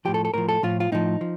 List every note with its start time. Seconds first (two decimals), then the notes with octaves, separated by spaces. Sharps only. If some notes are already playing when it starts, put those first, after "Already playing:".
0.05 A2 F3 G4
0.14 A4
0.25 A4
0.34 A2 F3 A#4
0.49 A4
0.63 A2 F3 F4
0.80 F4
0.92 A2 F3 D#4
1.21 F3